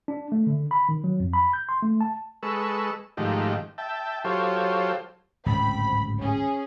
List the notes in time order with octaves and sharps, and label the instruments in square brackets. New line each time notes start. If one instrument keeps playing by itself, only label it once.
[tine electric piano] D4
A3
D3
B5
D#3
F#3
F2
B5
G6
C6
A3
A5
[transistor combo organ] G#3 A4 B4 C#6 E6
G#2 D#3 F3 A3 G4
E5 G5 A5
F#3 F4 G4 A4 C5 C#5
[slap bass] D1 G#1 C#2 [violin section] C4 B5
[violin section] C#4 G#4